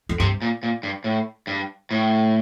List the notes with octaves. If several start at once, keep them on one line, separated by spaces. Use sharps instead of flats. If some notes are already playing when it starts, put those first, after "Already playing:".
F2
G2 C3
A#2
A#2
G2
A2
G2
A2